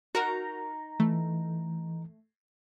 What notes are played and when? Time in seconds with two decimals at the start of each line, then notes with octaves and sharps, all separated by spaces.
0.15 D#4 F#4 A#4 A#5
1.00 E3 A3